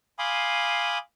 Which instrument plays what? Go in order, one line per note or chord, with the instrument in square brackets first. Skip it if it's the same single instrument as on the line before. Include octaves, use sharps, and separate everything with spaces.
[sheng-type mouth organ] F5 G#5 B5 C6 D6 D#6